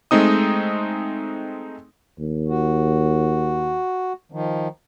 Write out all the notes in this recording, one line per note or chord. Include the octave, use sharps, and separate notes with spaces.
G#3 A3 C4 D#4 D#6
D#2
F#4
D#3 F3